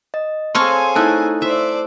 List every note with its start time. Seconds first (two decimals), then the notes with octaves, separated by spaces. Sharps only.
0.14 D#5
0.55 C4 G#4 A4 C5 C#5 F5 G#5 C6
0.95 A3 D#4 E4 A5 F#6
1.42 C5 D5 E5